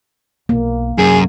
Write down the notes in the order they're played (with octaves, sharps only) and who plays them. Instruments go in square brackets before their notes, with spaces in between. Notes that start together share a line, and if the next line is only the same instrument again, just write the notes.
[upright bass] B1 [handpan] A#3
[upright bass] C2 [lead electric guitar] F#2 [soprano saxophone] G#4